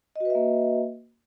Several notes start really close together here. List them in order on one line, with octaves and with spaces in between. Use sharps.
D#5 F#4 B4 E5 A#3